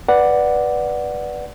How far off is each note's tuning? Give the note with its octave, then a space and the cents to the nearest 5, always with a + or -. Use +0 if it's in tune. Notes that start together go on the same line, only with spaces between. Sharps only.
B4 -5 D5 +0 F#5 +0